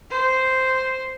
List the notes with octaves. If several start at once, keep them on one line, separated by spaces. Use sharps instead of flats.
C5